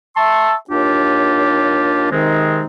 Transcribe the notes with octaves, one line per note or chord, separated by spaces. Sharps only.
E5 A5 C6 C#6 E6
D#2 D4 F4 G4 C#5
C3 D#3 G#3 C4 D#4